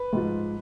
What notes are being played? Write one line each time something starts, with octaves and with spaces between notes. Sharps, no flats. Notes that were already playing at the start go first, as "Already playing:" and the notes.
Already playing: B4
G#2 F3